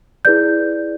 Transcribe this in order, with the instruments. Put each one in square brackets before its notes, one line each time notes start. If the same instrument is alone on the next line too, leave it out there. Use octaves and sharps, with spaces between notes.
[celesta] E4 G#4 B4 D5 G6